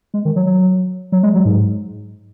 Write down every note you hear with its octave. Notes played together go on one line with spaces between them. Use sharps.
G#3
D#3
F#3
F#3
F#3
G#3
F#3
G#2